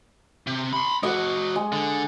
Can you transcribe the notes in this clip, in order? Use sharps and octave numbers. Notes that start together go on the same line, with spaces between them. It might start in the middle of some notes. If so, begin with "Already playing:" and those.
C3
B5 C6
G#3 F#4 D#5 F#5 D6
G#3
D3